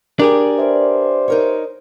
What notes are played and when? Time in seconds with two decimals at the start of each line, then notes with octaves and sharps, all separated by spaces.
0.19 D4 G4 G#4 A#4
0.58 B4 C5 D5 E5
1.28 D#4 A#4 C#5